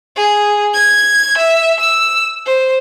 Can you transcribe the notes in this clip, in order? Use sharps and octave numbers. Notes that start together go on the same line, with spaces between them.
G#4
G#6
E5
E6
C5